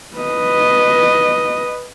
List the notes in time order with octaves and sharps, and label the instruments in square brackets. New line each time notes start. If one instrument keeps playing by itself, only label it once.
[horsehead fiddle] B4 D#5